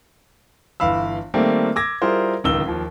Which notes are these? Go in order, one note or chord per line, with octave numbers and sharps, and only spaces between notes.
G1 E3 F5 B5 E6
D#3 G3 A3 A#3 C4
D6 E6 G#6 A#6
G3 E4 F4 G#4 A#4 C5
D1 C#2 D#3 E6 G7
D#2 F3